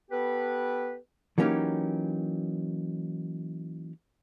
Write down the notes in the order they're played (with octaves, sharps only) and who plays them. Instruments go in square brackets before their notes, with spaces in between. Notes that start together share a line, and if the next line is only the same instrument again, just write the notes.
[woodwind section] B3 G4 A4 B4
[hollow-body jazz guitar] E3 F#3 A#3 C#4 D#4 G4